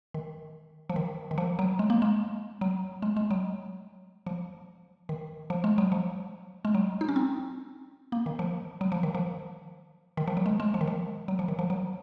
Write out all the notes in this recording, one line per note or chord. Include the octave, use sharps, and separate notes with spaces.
D#3
F3
D#3
D#3
F3
F#3
G#3
A#3
G#3
F#3
G#3
G#3
F#3
F3
D#3
F3
G#3
F#3
F3
G#3
F#3
D#4
C#4
C4
A#3
D#3
F3
F#3
F3
D#3
F3
D#3
F3
F#3
G#3
G#3
F3
D#3
F3
F#3
F3
D#3
F3
F#3